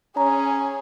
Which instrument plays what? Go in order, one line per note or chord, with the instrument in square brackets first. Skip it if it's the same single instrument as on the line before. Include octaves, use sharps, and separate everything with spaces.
[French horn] C#4 [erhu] G#4 [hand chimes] A#5